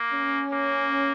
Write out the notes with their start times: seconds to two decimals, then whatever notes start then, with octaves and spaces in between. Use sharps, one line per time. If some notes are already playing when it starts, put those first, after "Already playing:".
Already playing: A#3
0.13 C#4
0.52 A#3